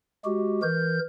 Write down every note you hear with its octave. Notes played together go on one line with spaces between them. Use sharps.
G#3 F#4 G4
E3 A#4 G6